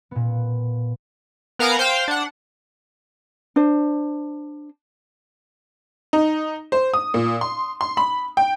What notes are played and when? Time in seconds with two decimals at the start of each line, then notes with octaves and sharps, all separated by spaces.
0.11 A#2 B3
1.59 B3 A#4 F5 F#5 G#5 A#5
1.79 C5 F5 G5
2.08 D4 F#5
3.56 D4 C5
6.13 D#4
6.72 C5
6.94 D#6
7.14 A#2
7.41 C6
7.81 C6
7.97 B5
8.37 G5